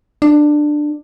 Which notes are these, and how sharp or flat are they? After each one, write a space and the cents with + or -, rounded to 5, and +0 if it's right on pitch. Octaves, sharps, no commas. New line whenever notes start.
D4 +15